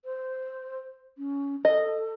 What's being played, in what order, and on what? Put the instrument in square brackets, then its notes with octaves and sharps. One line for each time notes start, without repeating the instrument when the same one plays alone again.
[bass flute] C5
C#4
[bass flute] A4 [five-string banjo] D#5